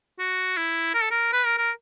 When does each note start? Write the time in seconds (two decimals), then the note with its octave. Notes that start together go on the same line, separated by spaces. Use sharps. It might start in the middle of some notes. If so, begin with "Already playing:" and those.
0.19 F#4
0.57 E4
0.94 A#4
1.03 A4
1.11 A#4
1.33 B4
1.45 A#4
1.58 A#4